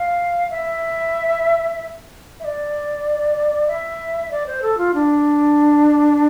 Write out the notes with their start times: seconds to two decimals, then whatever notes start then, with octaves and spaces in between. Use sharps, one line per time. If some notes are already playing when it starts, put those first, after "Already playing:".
Already playing: F5
0.50 E5
2.40 E5
2.44 D5
3.67 E5
4.31 D5
4.46 C5
4.62 A4
4.78 F4
4.94 D4